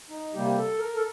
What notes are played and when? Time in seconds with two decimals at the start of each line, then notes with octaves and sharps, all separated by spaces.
0.10 D#4
0.34 C3 G3 A#3 G4
0.46 G4
0.56 A4
0.79 A#4
0.94 A4